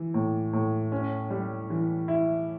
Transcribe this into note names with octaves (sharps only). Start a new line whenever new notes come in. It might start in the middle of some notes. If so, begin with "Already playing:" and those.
Already playing: E3
A2
A2
C#4
G3
E3
E4